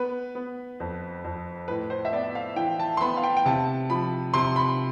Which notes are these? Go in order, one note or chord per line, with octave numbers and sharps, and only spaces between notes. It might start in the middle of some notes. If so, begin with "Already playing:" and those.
Already playing: B3 B4
B3
F2
F2
A2 B4
C5
E5
B3 D5
F5
E3 G5
A5
C6
B3 B5
F5
G5
G5
C3 A5
F3 B5
C3 C6
B5